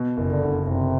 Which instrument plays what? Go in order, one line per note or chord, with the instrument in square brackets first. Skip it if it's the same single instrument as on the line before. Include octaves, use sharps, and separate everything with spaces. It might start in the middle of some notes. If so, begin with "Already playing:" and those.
Already playing: [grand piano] B2
F#1
[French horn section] D3
[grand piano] F#1
[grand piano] F#1 [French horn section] C3